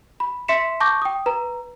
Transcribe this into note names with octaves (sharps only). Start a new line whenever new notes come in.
B5
E5 C6 B6 C#7 E7
A5 C#6 D6 G6 A#6
G5 D#6
B4 A#5